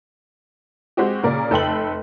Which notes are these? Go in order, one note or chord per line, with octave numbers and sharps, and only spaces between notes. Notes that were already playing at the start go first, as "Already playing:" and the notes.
G#3 C4 F#4 G4
A#2 C#3 A#4 D5
F1 A4 B4 G5 C6 F#7